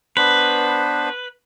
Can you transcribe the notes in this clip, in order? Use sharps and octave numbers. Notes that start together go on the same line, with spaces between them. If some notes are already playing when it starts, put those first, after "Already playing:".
B3 D4 B4 C5